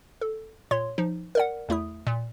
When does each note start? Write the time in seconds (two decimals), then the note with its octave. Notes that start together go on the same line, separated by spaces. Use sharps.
0.21 A4
0.71 A#2 C#5 C6
0.98 F3 D#4
1.35 A#4 D5 F#5
1.69 E2 A3 E4 D#6
2.07 A#2